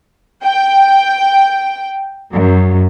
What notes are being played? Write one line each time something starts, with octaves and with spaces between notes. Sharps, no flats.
G5
F#2